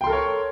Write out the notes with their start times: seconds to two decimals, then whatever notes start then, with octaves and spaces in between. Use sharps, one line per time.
0.01 G5
0.04 C6
0.07 A4
0.10 A#4
0.13 C#5